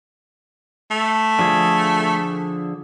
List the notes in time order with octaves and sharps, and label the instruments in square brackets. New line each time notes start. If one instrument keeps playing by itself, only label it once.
[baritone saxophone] A3
[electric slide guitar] D3 F3 G#4